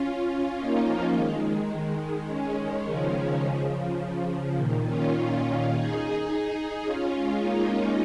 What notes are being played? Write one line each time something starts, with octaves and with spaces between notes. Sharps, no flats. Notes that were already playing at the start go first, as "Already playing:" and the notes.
Already playing: C#4 F4
A#3 D#4
F3 A#3
D#3 G#3
G#3 C#4
D#3 G#3
C#3 F3
C#3
C#3
A#2 D#3
C#4 F4
C#4 F4
C#4 F4
D#4 G#4
C#4 F4
G#3 C#4
A#3 D#4
G#3 C#4